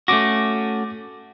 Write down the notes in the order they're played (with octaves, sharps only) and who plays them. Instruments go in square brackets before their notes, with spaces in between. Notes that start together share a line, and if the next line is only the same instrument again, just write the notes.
[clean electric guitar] A3 C#4 F#4 [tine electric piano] D6 A#6